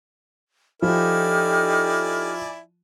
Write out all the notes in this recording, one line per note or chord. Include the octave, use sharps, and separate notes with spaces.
F3 D#4 E4 G4 A4 D5 G#5 F6